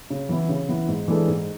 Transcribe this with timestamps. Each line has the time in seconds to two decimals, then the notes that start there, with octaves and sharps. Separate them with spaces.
0.10 C#3
0.29 E3 B3 E4
0.49 C#3
0.68 E3 B3 E4
0.88 G#2
1.08 E3 G#3 D4 A4
1.28 G#2